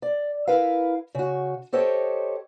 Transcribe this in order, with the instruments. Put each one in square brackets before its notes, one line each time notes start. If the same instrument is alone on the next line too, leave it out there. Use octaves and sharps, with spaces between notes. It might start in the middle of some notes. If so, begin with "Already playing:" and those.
[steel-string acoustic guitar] D5
E4 A#4 B4 F5
C#3 F#4
G4 A4 C5 C#5 D#5 G5